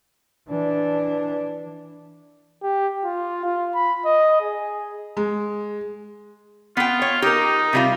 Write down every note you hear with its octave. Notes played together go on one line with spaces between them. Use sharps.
E3 D4
G4
F4
F4
B5
D#5
G#4
G#3
B3 F4 G5
C#5
D#4 G4 A#4
C3 G3 F4